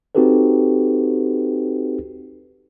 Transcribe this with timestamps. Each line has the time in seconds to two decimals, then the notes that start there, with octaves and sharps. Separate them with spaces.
0.15 C4 D#4 F#4 G4 A4 B4